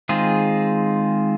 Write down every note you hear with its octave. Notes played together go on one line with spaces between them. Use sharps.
D#3 G#3 C4 F4 G#4